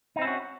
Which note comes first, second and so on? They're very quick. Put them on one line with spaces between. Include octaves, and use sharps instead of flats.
D#4 C4 E4 C#4 F#4